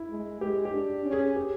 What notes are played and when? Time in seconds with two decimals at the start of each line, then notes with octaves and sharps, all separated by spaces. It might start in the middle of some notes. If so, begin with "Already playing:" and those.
Already playing: E4
0.09 G#3
0.41 G#3 G4
0.65 G4
0.73 D4
1.05 C#4
1.12 G#4
1.36 G4